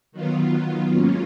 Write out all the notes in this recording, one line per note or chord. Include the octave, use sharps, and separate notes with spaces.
D#3 F#3 B3 F4
G#2 F#3 A#3 C#4 F4